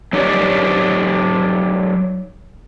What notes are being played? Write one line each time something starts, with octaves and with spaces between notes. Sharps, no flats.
F#3 D#4 G4 C#5 D5